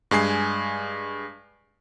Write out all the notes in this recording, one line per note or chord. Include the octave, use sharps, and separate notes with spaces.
G2 G#3 G#5 C7